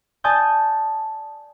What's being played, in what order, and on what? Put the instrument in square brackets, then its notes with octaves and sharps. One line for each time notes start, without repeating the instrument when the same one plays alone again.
[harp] D5 G#5 A5 D#6 G6